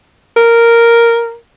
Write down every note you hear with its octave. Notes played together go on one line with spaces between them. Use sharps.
A#4